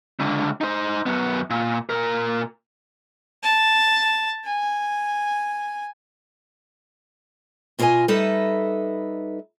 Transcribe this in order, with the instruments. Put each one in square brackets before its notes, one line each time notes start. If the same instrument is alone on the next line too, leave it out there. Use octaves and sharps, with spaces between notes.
[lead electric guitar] C#2 D3
D#4 C5
F#2 B3
A#2
A#2 A#4
[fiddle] A5
G#5
[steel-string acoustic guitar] B2 F4 A#4 D5 D#5 G#5
G3 D#4 A4 B4 D#5 E5